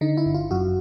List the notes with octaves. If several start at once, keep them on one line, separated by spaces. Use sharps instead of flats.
D3 D#4
E4
G1
F4
F#2 F#4